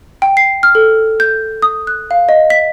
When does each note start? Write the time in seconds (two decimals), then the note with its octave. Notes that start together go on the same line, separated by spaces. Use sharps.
0.22 G5
0.37 C7
0.63 F6
0.75 A4
1.20 G6
1.62 D#6
1.87 F#6
2.11 F5
2.29 D#5
2.50 B6